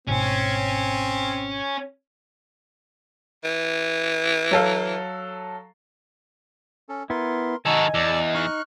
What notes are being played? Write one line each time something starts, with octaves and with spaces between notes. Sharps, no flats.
G#1 G#2 B2 C4 C#4
E3
F#3 A4 F5
C#4 A4
B3 E4 A#4 C6
D#3 D#4 F#4 A4 D#5 G#5 E6
E2 D5 A5 E6
D#4 C#6 F6 F#6